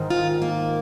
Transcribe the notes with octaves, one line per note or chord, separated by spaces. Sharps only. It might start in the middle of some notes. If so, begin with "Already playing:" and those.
Already playing: G#2 D#3
F4
A#3